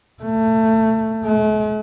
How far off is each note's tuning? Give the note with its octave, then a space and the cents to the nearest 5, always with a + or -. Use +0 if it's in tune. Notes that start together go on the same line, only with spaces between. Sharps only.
A3 +20
A3 -45